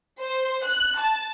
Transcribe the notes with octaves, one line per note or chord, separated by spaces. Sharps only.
C5
F#6
A5